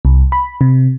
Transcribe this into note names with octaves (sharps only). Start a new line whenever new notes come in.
C2
B5
C3